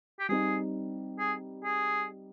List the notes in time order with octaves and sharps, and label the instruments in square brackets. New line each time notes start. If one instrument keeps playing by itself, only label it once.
[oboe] G4
[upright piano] G3 C4 D#4 [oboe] G#4
[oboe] G#4
G#4